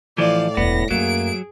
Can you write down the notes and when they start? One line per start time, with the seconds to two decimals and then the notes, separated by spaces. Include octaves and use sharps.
0.18 A2 E3 F3 D5 F5
0.57 E1 D2 B3 A#6
0.91 F#2 F#3 A3 A#3 G#4 D7